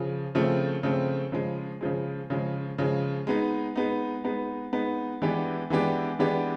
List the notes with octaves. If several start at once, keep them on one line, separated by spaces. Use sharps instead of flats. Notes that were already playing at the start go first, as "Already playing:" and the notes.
Already playing: C#3 F3
C#3 F3 A3 C4
C#3 F3 A3 C4
C#3 F3 G#3
C#3 F3 G#3
C#3 F3 G#3
C#3 F3 G#3
G#3 B3 D#4
G#3 B3 D#4
G#3 B3 D#4
G#3 B3 D#4
E3 G#3 B3 D4 G4
E3 G#3 B3 D4 G4
E3 G#3 B3 D4 G4